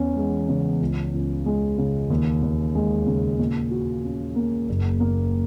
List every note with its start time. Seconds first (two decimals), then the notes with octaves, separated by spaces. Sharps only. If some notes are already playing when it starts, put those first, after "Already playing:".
Already playing: E2 C#4
0.16 G#3
0.49 C#3
0.80 C#2
1.14 C#2
1.46 G#3
1.78 C#3
2.10 D#2
2.42 D#2
2.75 G#3
3.07 C#3
3.39 A#2
3.71 F#4
4.04 C#4
4.36 A#3
4.69 F#1
5.00 A#3